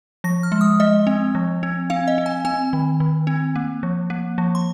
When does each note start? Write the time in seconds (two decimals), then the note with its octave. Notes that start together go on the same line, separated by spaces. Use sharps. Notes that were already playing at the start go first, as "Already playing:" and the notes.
0.24 F3 A#6
0.43 F6
0.52 G#3
0.61 D#6
0.80 G#3 D#5
1.07 C4
1.35 F3
1.63 C4
1.90 C4 F5
2.08 D#5
2.18 C4
2.26 G#5
2.45 C4 G#5
2.73 D#3
3.00 D#3
3.27 C4
3.56 A#3
3.83 F3
4.10 A#3
4.38 F3
4.55 C6